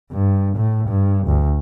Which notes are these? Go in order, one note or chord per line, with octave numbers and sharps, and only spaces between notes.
G2
A2
G2
D2